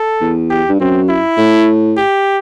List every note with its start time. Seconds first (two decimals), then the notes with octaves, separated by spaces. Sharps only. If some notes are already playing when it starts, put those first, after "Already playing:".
Already playing: A4
0.21 E2
0.50 G4
0.69 G2
0.80 F#2 C4
1.09 E4
1.38 A2
1.97 G4